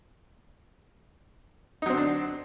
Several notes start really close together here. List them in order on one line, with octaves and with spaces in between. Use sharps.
D#4 F#3 C4 D3 D4